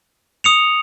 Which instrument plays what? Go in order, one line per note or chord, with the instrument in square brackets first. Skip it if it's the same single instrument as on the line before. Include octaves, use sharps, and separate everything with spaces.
[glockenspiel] D#6 C#7 F7